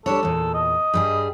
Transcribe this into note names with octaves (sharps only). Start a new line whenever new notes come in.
G3 D4 A4 C#5
E2 A#2
D#5
G2 G3 G#4